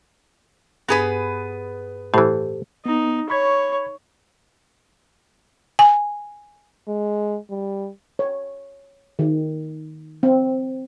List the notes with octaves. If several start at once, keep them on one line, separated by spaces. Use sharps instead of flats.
G2 B3 G#4 B4
A2 E3 G4 A4 C5
B3 D#4
C#5 B5 C#6 G#6
G#5
G#3
G3
C#5
D#3
C4